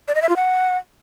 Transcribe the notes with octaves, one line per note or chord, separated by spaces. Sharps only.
D5
D#5
E5
F4
F#5